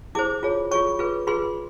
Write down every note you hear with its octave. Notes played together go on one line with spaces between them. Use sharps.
E4 G#4 C5 D6
F4 G#4 C#5
F4 G#4 C#5 C#6
F4 G#4 B4
F4 G#4 B4 C6